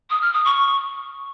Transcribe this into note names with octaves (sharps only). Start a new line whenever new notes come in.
D#6
F6
D#6
C#6